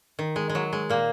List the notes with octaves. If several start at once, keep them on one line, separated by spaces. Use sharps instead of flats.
D#3
G#3
G#3
F#3
G#3
A#2 A#3